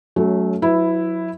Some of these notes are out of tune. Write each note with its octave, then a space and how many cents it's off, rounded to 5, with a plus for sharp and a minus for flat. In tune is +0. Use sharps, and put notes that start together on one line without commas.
F#3 +5 A3 -20 C#4 +20
F#3 -25 E4 +0 B4 +15